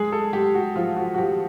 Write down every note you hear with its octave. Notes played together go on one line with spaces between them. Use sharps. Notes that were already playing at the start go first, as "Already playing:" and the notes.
Already playing: G#3 G#4
A4
G#3 G4
F#4
F3 F4
F#4
F#4
F3 G4